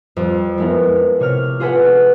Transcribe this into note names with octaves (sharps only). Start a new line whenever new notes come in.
F2 G3
F3 G#3 B3 E4 A#4
C3 C#5 F6
F4 G#4 A4 B4 F#5